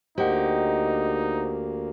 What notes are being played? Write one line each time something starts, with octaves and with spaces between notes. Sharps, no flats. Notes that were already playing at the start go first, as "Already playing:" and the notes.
D2 A#3 D#4 G4 C5 D#5 F#5